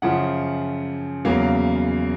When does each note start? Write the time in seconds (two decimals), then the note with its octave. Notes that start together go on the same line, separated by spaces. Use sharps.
0.02 F#2 C#3 F3 F#5
1.25 E2 C#3 F#3 A#3 F5